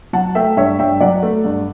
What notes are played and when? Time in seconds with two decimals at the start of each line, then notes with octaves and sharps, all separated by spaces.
0.13 F#3 F#5 A5
0.35 A3 E5 G5
0.57 G2 C#5 E5
0.79 G2 E5 G5
1.00 F#3 D5 F#5
1.23 A3
1.44 G2